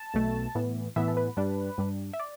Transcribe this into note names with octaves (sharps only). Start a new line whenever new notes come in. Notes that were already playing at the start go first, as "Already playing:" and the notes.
Already playing: A5
B1 B2 A3
A2 E3 B3
A2 E3 B3 E5
A4
B4
G2 G3 D4
G2 G3 D4
E5
D5